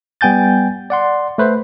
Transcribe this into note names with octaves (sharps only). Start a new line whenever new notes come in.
G3 B3 G5 G#5 G6 A6
D5 F#5 C6
A3 B4 C5